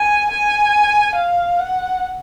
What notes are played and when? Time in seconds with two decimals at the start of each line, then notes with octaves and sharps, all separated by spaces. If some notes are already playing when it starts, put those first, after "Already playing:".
Already playing: G#5
0.31 G#5
1.15 F5
1.59 F#5